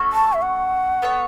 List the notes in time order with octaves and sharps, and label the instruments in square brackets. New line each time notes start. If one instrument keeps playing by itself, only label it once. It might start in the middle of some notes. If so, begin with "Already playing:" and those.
Already playing: [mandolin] A3 C#4 F#4 A4
[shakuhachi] A5
E5
F#5
[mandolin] B3 A4 C#5